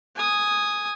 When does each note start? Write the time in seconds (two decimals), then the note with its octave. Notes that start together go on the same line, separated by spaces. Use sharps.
0.16 G#5 D#6